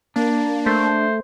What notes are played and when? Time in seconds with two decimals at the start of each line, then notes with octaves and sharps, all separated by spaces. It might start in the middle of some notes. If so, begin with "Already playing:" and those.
0.16 A#3 D4
0.66 A3 C5